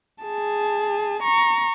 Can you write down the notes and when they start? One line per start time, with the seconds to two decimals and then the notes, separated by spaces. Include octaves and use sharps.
0.23 G#4 A5
1.23 A#5 C#6